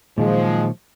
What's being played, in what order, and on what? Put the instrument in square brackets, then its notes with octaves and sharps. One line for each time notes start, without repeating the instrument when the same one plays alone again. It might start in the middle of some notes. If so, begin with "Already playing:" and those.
[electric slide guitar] A#2 D#3 F#3 [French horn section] F3 G#3